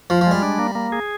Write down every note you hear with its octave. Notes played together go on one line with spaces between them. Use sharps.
F3 F4
F3
G3 G#3
D4
A#3
A#3
G#4